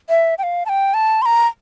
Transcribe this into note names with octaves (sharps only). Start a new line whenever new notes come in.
E5
G5
F5
A5
G5
A5
C6
A#5